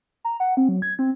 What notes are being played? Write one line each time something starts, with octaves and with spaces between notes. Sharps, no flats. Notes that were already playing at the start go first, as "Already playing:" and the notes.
A#5
F#5
C4
F#3
G#6
C4